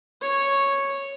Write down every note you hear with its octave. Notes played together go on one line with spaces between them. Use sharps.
C#5